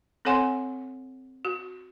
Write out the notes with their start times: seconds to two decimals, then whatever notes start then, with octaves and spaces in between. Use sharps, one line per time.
0.25 C4 A4 C#5 F#5 G#5 C6
1.45 F#4